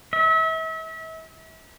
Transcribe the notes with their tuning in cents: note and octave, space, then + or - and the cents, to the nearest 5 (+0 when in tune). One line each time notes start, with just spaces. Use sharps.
E5 -35